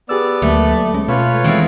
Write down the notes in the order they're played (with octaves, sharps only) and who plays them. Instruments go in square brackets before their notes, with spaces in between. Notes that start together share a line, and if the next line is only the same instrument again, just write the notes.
[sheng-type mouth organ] B3 D5 [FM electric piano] G4 G#4 E6
[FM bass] D2 [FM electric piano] F#3 A#3 [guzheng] A3
[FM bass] G#3 [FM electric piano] C#4
[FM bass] B2 [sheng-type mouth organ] F4 B4 C#5
[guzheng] E2 C4 [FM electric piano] D#3 G#3